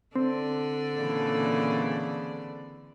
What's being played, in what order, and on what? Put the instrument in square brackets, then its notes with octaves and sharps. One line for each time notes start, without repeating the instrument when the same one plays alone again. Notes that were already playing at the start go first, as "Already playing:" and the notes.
[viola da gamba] D3 A4 D5 [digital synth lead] C4
[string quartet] A#2 C#3 E3